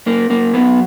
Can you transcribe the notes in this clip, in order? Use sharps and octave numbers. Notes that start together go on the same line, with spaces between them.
F#2 A#3
F#2 A#3
F#3 B3